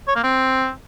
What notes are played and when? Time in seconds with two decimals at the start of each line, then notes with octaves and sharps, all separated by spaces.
0.08 C#5
0.16 A#3
0.24 C4